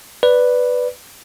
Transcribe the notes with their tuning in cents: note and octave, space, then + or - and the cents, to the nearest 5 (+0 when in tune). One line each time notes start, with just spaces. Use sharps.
B4 +0 D5 +0